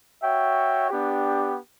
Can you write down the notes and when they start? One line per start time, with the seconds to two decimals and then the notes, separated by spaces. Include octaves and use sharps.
0.22 F#4 C#5 E5 G5
0.89 B3 D4 G4